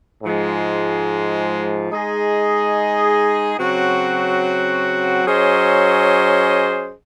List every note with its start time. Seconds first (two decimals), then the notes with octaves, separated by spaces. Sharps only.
0.23 G#2 F3 G#3
1.90 G#3 D#4 G#4 D#5
3.58 C#3 F#3 C4 F#4
5.25 F#3 C#4 G#4 C5 D#5